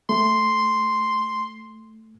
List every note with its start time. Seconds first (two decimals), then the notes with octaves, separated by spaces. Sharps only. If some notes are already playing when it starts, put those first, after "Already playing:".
0.09 A3 C6